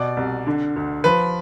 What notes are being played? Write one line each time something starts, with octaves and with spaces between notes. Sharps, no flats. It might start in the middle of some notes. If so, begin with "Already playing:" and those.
Already playing: B2 D5
C2
D3
D2
F3 B4